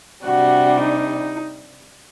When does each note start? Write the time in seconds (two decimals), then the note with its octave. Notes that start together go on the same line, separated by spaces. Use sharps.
0.24 C3 G3 D4 F#4
0.80 D#4